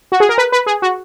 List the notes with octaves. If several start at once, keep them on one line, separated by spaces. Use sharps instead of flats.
F#4
G#4
A#4
B4
B4
G#4
F#4